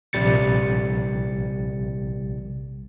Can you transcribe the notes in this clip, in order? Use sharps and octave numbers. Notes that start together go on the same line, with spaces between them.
A#1 C3 G3 A6 C#7